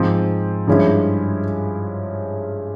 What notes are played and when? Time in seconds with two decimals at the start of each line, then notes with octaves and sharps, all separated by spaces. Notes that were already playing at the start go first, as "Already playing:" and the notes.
Already playing: G#2 F3 C4
0.67 G2 F3 G#3 C#4 E4